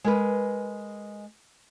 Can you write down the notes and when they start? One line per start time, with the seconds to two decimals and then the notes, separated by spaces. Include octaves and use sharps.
0.04 G#3 A#4 B4